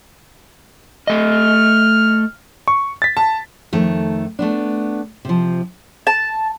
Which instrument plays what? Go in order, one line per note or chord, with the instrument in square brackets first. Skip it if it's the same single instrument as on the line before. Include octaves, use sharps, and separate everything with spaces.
[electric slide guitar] A3 D#5 [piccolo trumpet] F6
[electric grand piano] C#6
A6 B6
[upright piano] A5
[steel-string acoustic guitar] F2 D#3 A3
A3 B3 D4
C3 F3
[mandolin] A5